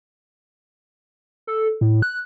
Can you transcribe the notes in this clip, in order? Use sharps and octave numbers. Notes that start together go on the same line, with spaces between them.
A4
A2
F#6